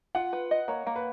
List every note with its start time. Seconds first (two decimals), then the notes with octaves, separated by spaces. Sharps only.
0.15 F4 F#5
0.33 B4
0.51 D#5
0.68 A#3 C#5
0.87 A#3
0.96 B4